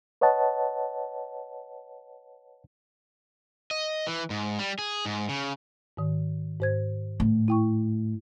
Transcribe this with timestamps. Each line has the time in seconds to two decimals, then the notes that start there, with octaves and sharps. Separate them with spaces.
0.21 B4 C#5 D#5 F#5 A5
3.71 D#5
4.07 E3
4.30 G#2
4.59 G3
4.79 G#4
5.06 G#2
5.29 C#3
5.97 G#2 D#3
6.60 G#2 C5 G#6
7.20 A2
7.48 E4 G5 C#6